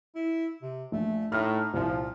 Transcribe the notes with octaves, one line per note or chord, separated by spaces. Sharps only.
E4
C3
A#1 A3
A2 D#4 F6
C2 A#2 F3